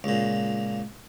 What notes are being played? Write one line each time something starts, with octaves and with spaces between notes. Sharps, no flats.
C#2 A#2